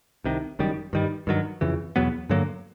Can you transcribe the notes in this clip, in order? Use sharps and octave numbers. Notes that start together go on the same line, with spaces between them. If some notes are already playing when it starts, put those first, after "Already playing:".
C2 C3 D#3
F#1 F#2 D#3 G3
G2 D#3 G3
G2 D#3 F#3
F2 C#3 E3
E2 B2 F#3 B3
G2 D3 F#3 A#3